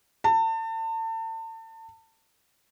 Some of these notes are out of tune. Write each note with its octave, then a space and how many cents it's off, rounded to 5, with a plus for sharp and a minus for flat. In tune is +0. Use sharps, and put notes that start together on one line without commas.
A5 +35